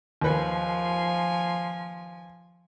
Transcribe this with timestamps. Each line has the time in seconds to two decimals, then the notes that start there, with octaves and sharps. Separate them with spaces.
0.21 D#2 F3 B4 G#5